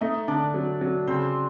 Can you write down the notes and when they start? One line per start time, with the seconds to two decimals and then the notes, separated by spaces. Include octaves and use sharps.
0.01 A3 D#4 D#5
0.28 D3 D4 D5
0.54 F#3
0.81 F#3
1.07 C#3 C4 C5